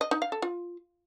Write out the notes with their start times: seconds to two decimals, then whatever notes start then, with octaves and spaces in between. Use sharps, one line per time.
0.01 D#5
0.11 D#4
0.22 F5
0.32 A4
0.42 F4